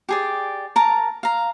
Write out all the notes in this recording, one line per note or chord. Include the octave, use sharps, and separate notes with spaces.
G4 G#4 D5
A#4 A5 A#5
F5 A#5